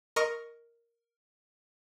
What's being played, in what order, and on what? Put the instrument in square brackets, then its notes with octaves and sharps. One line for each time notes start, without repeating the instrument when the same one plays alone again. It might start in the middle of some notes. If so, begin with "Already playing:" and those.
[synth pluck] A#4 D#5 C#6